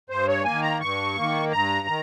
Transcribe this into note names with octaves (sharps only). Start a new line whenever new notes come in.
G2 C5
C#5
A#3 G#5
D#3
A#5
G2 C#6
D#3 A#3
G2 A#5
D#3